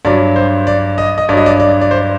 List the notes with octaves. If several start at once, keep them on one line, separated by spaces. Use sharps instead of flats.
G2 F#3 D5
C5
D5
D#5
D#5
G2 F#3 D5 D#5
D5
D5
D5
C5